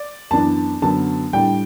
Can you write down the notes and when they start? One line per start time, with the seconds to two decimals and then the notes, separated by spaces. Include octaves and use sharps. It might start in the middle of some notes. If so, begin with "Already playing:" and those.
Already playing: D5
0.31 F#2 E3 B3 D4 A5
0.82 F#2 D3 F#3 B3 A5
1.33 A2 G3 D4 G5